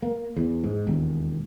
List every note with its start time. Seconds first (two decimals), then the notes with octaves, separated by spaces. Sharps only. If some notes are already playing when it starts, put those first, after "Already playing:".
0.02 A#3
0.36 E2
0.63 G#2
0.87 E1 D#2